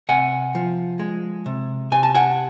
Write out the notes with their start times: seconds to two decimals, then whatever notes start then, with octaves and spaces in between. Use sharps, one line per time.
0.09 C3 F#5 G#5
0.55 F3
0.99 G#3
1.46 C3
1.92 C3 G#5
2.03 A5
2.15 F#5 G#5